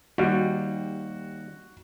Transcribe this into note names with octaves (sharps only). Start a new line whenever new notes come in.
D#2 G3 F#4